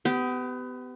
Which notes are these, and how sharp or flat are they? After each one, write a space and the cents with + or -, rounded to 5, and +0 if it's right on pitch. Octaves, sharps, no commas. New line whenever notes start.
B3 +30 G4 -10